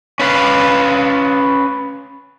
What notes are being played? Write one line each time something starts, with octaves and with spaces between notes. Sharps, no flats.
C#4 B4 F5